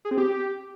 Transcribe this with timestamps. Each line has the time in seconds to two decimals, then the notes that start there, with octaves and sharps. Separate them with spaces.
0.05 G#4
0.11 C4
0.18 G4